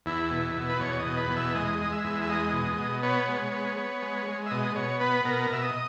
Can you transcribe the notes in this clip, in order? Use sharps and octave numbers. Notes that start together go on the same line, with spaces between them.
E2 E4
B2
B2
B4
E2 C#5
D#5
B2
B4
E2
E5
G#3 D#5
G#3
E5
E2
E5
G#3 D#5
B2
B2
B3 C#5
G#3
B3
B3
G#3
G#3
E5
B2 D#5
B2 C#5
B3 B4
B2 A#4
B2 E5
D#5